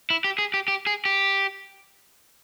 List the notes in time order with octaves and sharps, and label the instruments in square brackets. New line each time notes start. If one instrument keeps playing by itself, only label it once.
[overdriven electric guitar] E4
G4
G#4
G4
G4
G#4
G4